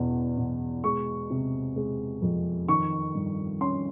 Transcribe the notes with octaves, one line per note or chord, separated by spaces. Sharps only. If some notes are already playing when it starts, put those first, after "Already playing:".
Already playing: E2 B2
B2
G#3 C#6
C3
G#3
F2
D#3 C#6
G2
C#4 C6